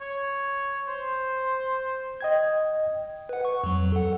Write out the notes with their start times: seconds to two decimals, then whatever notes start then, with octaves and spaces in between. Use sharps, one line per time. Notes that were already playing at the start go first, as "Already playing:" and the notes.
0.01 C#5
0.88 C5
2.21 D#5 G5 G#6
3.29 B4 F#5
3.45 C#6
3.64 F2 F#3
3.92 A4 F#5